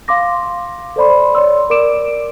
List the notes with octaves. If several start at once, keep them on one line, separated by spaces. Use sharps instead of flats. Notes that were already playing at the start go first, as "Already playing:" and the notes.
F5 C6 D6 A#6
A4 C5 D5 B5 C6
C#5 D5 C6 E6
A#4 D5 D6 D7 E7